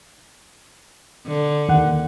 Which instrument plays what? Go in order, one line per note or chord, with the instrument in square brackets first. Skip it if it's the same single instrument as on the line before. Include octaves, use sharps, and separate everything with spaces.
[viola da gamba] D3
[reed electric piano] D#2 A#3 F#5